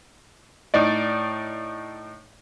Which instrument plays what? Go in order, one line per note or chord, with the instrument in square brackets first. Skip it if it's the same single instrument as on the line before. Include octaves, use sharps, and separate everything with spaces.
[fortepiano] A2 D#4 D5